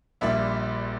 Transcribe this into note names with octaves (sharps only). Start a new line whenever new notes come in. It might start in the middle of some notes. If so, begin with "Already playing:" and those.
A#1 A#2 G3 E5